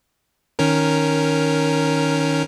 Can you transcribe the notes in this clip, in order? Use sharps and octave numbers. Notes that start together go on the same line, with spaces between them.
D#3 C#4 A#4